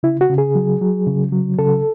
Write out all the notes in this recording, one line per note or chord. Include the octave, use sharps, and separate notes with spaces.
C#3 E4
F#4
C#3
G#4
F#3
F#3
C#3
F#3
C#3 A4